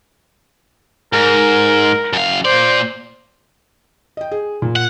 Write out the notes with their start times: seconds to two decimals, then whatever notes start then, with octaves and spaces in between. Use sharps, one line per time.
1.13 G#2 A#4
2.13 F#2 F5
2.45 A#2 C5 D5
4.17 D#5 G5
4.32 G#4
4.62 A#2
4.76 F#5